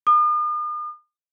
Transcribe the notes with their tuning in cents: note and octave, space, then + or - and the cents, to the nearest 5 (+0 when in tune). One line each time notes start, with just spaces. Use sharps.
D#6 -45